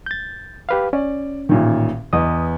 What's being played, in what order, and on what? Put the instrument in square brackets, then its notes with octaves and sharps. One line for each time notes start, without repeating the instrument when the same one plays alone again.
[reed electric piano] G6 A6
G4 B4 F5
[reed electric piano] C#4 [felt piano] D5
[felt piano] A1 A#2 D#3
[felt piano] E2 B3 D#5 [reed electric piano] D#6